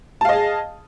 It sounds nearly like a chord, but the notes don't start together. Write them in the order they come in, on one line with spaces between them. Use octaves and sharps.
A5 F5 D#5 G#4